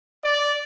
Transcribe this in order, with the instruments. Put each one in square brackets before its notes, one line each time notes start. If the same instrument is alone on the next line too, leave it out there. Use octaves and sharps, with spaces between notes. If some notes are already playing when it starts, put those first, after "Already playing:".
[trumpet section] D5